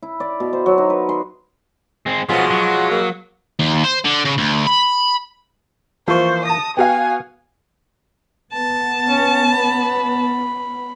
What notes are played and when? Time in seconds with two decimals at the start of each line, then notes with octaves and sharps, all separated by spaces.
0.02 E4
0.20 D5
0.40 B2
0.53 C5
0.66 F#3
0.78 D#4
0.90 B4
1.09 C6
2.06 G#3 C4
2.29 B2 F3 F#3 G#3 B3 F4
2.51 F#3
2.91 A#3
3.59 D#2
3.84 C5
4.05 D3
4.25 C#3
4.38 D2
4.66 B5
6.08 E3 F3 A#3 F4 C5 C#6
6.45 A5 D#6 A#6
6.77 B3 F#4 F5 G5 G#5
8.53 B3 A5
9.09 C#4
9.51 B5